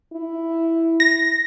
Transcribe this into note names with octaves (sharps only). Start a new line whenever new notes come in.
E4
A#6